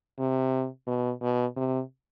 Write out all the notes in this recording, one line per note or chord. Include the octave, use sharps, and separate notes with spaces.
C3
B2
B2
C3